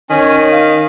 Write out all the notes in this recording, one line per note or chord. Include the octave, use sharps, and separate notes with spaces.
D#3 C#4 G#5
F5